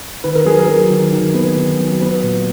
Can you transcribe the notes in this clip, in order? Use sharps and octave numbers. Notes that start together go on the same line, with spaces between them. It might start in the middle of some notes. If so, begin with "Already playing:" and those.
D#3 B4
A#4
F#3 G#4
A#4
F#3
D#3
D#3
B3
D#3
F#3
B3 B4
A#2